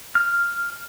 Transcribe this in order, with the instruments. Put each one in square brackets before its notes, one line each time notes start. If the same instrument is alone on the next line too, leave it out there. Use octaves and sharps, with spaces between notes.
[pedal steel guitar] F6